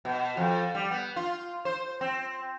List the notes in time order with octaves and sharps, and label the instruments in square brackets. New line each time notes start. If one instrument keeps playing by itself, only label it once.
[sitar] B2
F2
G3
B3
F4
C5
C4